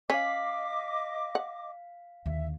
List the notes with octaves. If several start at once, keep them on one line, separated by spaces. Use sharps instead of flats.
C#4 D#5 F5 D6 B6
F#5
D#2 D3 E5